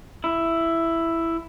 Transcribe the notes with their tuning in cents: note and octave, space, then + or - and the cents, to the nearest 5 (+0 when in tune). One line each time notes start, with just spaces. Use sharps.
E4 +5